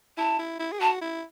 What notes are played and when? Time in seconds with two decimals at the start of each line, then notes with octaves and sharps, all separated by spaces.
0.17 E4 A5
0.39 E4
0.59 E4
0.72 G#4
0.80 F#4 A5
1.01 E4